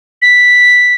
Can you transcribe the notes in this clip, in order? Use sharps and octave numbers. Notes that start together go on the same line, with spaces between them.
B6